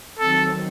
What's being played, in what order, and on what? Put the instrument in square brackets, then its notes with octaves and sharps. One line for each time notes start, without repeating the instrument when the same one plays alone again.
[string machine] D#3 F#3 C4 [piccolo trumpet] A4